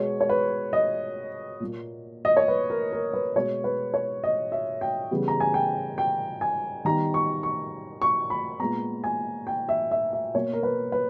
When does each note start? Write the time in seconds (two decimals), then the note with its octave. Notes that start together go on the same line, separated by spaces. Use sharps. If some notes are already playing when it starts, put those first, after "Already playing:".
Already playing: B2 G#3 B3 C#5
0.20 C#5
0.29 B4
0.73 D#5
1.60 A#2 A#3
2.25 D#5
2.37 C#5
2.48 B4
2.70 A#4
2.92 A#4
3.13 B4
3.36 B2 G#3 B3 C#5
3.64 B4
3.94 C#5
4.24 D#5
4.52 E5
4.81 G5
5.11 C#3 E3 G3 B3
5.28 A#5
5.40 G#5
5.54 G5
5.98 G5
6.41 G#5
6.85 D#3 G3 B3 A#5
7.14 C#6
7.43 C#6
8.02 C#6
8.30 B5
8.59 A#2 G#3 B3 A#5
9.04 G#5
9.47 G5
9.69 E5
9.91 E5
10.13 E5
10.34 B2 A#3 C#5
10.53 A#4
10.63 B4
10.92 B4